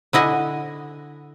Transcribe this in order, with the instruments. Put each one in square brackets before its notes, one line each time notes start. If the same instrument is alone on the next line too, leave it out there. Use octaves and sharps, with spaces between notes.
[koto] D3 E4 D#5 F#5 G#5